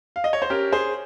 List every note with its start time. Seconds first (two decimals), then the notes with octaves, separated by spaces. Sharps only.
0.16 F5
0.24 D#5
0.33 C#5
0.42 C5
0.50 C#4 G4 A#4
0.72 G#4 C5